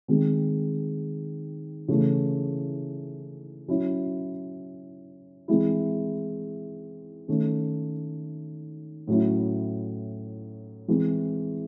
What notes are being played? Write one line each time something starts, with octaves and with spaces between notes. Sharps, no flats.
D#3 G#3 C4
C#3 E3 A3
F#3 C#4 E4
E3 G#3 C4 E4
D#3 A3 C#4
A2 F#3 C#4 E4
E3 G#3 C4